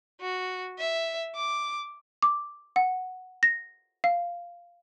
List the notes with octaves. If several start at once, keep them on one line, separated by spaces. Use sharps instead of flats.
F#4
E5
D6
D6
F#5
A#6
F5